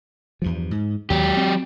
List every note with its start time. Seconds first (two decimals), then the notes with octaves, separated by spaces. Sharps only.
0.42 E2 G2 F3
0.71 G#2
1.10 D#2 F#3 G4
1.37 C4